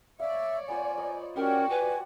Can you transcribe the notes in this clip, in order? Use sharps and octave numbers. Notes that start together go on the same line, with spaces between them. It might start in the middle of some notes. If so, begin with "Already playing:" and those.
C#5 D5 E5 F5
B3 F4 C5 G#5
A#4 D#5 D#6
C#4 F#4 G4 A#4 D5 G5 D6
B4 G#5